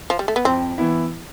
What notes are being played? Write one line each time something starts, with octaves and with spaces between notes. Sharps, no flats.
F3
G3
A3
B3
F2 C4
E3 B3 E4